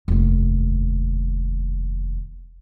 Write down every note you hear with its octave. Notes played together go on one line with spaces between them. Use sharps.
F1 D#2